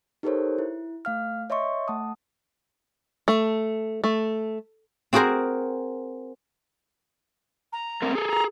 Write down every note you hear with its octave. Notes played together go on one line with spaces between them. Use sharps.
D#4 G4 A4 A#4 C5 C#5
E4
A3 F5 F6
C#5 D#5 E5 C6 C#6
A3 F#5 A5 D#6
A3
A3
C4 F#4 G#4 A#4 C5
A#5
A3 C4 A#4
G#4 A4
A#5